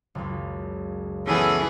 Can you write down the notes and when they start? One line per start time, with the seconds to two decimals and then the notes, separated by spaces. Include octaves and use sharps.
0.15 F#1 C#2
1.27 E3 B3 C#4 G#4 A4